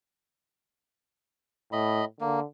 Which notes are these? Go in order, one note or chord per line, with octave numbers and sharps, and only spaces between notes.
A2 D#5 B5
D3 A#3